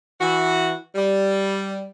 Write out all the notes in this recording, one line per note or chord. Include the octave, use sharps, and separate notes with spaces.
E3 F#4
G3